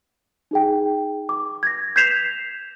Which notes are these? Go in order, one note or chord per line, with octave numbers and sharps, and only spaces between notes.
D#4 G#4 G5
D6
G#6 A#6
G6 G#6 B6 C7 E7 F7